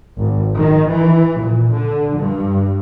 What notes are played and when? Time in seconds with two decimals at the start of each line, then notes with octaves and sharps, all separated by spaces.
0.16 G#1
0.56 D#3
0.88 E3
1.38 A#2
1.72 D3
2.16 G2